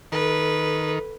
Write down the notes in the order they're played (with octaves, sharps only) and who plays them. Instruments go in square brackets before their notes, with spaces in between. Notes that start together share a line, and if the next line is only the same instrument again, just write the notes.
[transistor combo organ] D#3 [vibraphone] A4 [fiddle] B4